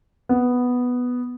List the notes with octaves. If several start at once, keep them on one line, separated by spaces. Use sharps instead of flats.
B3